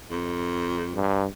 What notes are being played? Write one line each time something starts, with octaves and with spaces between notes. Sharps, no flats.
F2
G2